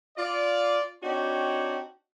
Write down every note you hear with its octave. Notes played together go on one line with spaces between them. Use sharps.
F4 D5
C4 D4 D#4 F#4 G4 C#5